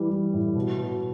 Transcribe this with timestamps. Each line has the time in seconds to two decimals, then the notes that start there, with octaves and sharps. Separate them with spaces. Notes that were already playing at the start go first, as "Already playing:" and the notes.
Already playing: E3 G3
0.10 E3
0.34 A2
0.55 B2
0.78 B2